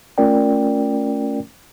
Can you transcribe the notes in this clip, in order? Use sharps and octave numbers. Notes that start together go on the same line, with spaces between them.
A3 C#4 F4 A#4 D5 G5